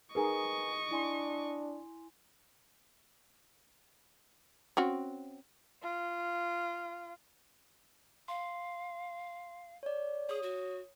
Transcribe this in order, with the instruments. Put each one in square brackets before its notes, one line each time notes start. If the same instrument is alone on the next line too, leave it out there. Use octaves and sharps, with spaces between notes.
[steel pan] D#4 G#4 A#4 [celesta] B4 G#5 A#5 [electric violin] D#5 C#6
[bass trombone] D4 [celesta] E4 G#5 C6
[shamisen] C4 C#4 F#4
[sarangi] F4
[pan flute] F5 [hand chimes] C6
[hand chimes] C#5 D5
[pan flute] G#4 [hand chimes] C#5 D#6
[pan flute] F#4